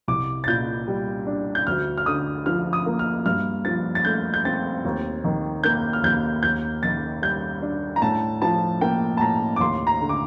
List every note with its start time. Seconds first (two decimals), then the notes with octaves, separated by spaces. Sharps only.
0.08 C2 D6
0.44 A6
0.47 A#2 G6
0.88 G3
1.27 D4
1.55 G6
1.67 D2 F6
1.98 F6
2.06 D3 D#6
2.46 F3 F6
2.73 D#6
2.86 A#3
2.99 F6
3.26 G2 F6
3.65 F3 A6
3.95 A6
4.05 A3 G6
4.34 G6
4.45 C4 A6
4.85 D#2
5.24 D#3
5.64 A#3 G6
5.93 F6
6.03 D#2 G6
6.43 D#2 G6
6.83 D#3 A6
7.22 G3 G6
7.62 D4
7.96 A#5
8.02 A2 A5
8.42 F3 A5
8.81 A#3 G5
9.17 A5
9.21 A2 A#5
9.56 D6
9.60 D#2 C6
9.87 A#5
10.00 D3
10.09 D6